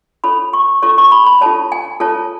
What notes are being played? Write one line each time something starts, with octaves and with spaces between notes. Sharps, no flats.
F4 A4 C#5 B5
C#6
F4 A4 C#5 C#6
C#6
B5
B5
F4 A4 C#5 A5
G#5
F4 A4 C#5 A5